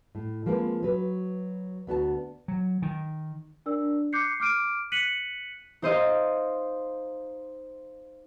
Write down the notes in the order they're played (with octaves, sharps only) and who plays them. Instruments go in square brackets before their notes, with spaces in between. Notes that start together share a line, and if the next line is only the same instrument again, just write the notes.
[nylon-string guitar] A2
F3 G#3 A#3 C4 B4
F#3 B4
D2 B3 F#4 A5
[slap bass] F#3
D#3
[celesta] D4 A#4 D5 E6
D6 F#6 G6 C7 C#7
D6 F6 D7 D#7
F#6 B6 C#7 D#7 F#7
[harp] D#4 C5 D#5 F5